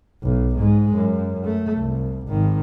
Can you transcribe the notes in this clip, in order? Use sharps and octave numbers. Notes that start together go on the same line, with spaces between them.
B1
G#2 G#3
F#2
A3
C2
G#1 D#3